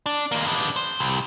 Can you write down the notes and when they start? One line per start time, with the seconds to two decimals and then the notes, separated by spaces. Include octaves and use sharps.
0.06 D4
0.32 D#2 A#3
0.47 B3 D4
0.76 C5
1.00 C2